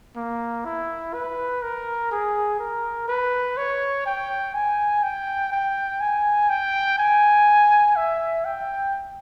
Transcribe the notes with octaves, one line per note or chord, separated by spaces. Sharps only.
A#3
E4
B4
A#4
G#4
A#4
B4
C#5
G5
G#5
G5
G5
G#5
G5
G#5
E5
G5